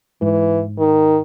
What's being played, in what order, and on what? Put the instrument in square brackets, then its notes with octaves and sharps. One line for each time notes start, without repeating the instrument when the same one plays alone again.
[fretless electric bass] G#2 [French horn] E3
[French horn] D#3